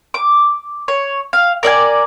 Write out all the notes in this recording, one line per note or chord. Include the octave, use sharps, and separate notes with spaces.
D6
C#5
F5
A#4 D5 E5 G#5